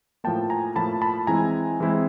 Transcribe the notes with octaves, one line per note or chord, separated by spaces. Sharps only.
A2 F3 A#3 G5 A5
G#5 A#5
A2 F3 A#3 A5 B5
A5 B5
E3 G#3 C4 E4 G#5 A#5
E3 G#3 C4 E4